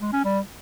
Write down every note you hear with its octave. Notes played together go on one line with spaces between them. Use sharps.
G#3
C#4
G3